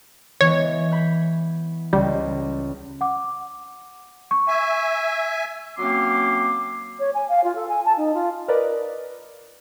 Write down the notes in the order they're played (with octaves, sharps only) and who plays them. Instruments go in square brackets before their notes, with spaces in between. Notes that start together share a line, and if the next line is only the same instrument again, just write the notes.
[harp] E3 G#3 B3 [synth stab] C#5
[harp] B5 G6
[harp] C#2 [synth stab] G3
[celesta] F#5 D6
C#6
[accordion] E5 G#5
[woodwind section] F#3 A#3 C4 C#4 C6 D6
[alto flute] C#5
G#5
F5
F4
A4
G#5
A5
D#4
F4
[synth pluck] A#4 B4 D5 D#5